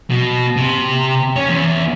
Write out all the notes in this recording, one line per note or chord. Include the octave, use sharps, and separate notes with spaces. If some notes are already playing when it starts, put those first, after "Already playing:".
B2
C3
C#4 C#5
E2